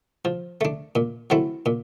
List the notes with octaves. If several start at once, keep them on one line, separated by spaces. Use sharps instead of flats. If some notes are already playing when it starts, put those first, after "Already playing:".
F3
A3 D4
A#2
F#3 A3 C4 E4
A#2